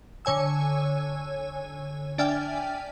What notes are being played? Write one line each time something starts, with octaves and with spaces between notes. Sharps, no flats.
D3 C#5 G#5 E6
D4 D5 E5 G5 G#5 F6